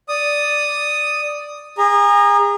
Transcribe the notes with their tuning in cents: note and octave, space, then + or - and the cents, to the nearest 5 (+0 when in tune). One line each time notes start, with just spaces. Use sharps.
D5 +0 D#6 +0
G#4 -30 A#5 +5